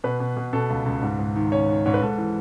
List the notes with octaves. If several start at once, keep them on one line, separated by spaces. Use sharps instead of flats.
B2 B4
B2
B2
B2 A4
C#2
C#2
G#2
G#2
D#3
D#3 C#4 C#5
D#3
G#2 C#5
B4
G#2 A4
E3